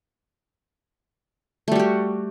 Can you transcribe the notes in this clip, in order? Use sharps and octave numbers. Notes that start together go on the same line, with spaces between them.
G3 A3 F#4 G4